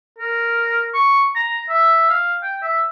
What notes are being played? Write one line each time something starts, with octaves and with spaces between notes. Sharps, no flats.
A#4
C#6
A#5
E5
F5
G5
E5